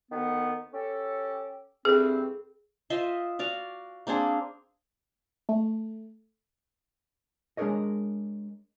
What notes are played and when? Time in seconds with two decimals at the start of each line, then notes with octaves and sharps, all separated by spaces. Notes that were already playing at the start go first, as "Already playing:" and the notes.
0.12 D2 D#3 B3
0.73 C#4 G4 A4
1.85 G2 E3 C4 G#4 A4
2.90 F4 C5 D#5 E5
3.39 F#4 D5 F5
4.07 A#3 C4 D4 G#4
5.49 A3
7.57 G#3 D4 G#4 A#4 C#5 D#5